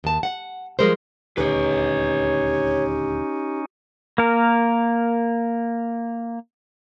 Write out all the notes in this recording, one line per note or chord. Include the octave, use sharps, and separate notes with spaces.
D#2 A5
F#5
F3 G3 G#3 A#4 C5
D#1 D2 C#4 D#4 G4 B4 C#5
A#3 A#4